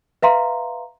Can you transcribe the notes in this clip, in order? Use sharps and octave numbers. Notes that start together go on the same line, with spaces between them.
B4 E5 F5 A#5 C6